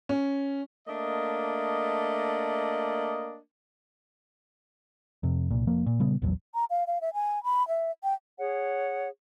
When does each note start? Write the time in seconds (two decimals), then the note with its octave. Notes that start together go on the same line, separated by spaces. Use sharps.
0.09 C#4
0.87 A3 A#3 D4 D#5
5.23 F2 C3
5.51 C2 A#2
5.67 F1 F3 A#3
5.86 A#2
5.99 A#2 C#3 G3 B3
6.22 A#1 E2 C#3 F#3
6.55 A#5
6.70 F5
6.87 F5
7.01 E5
7.14 G#5
7.44 B5
7.68 E5
8.04 G5
8.39 G#4 C#5 F#5